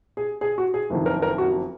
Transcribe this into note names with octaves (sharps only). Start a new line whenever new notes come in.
G#4
G#4
F#4
G#4
F#1 F2 D#3
A#4
A#4
F#4